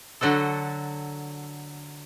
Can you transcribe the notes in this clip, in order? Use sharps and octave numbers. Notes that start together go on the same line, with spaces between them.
D3 F#3 F#4 A4